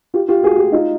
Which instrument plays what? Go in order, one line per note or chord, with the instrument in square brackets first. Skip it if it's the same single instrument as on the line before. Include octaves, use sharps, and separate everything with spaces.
[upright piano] F4 G4
F4 G4
F#4 G#4
F4 G4
D#4 F4